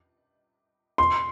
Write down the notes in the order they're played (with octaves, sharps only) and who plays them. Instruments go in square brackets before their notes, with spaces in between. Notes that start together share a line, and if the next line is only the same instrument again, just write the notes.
[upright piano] C6